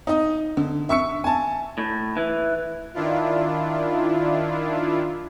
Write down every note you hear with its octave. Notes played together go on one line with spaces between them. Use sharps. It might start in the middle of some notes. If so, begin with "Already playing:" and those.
D#4 D#5
D3
E5 C#6 E6 C#7
G#5 A5
A2
E3
D#3 D4 E4 F4